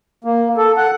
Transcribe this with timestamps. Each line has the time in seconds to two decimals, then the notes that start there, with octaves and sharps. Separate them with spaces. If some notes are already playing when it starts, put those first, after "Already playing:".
0.24 A#3
0.57 A4
0.77 F#5